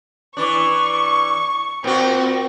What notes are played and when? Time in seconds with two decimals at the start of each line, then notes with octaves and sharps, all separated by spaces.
0.37 E3 D4 C#6
1.84 A#2 C4 F#4